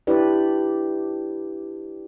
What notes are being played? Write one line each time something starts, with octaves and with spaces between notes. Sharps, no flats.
D4 E4 G4 B4 D5